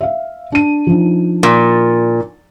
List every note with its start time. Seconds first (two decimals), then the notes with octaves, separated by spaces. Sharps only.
0.01 E5 F5
0.52 D4 D#7
0.87 F3 D4 D#4
1.43 A#2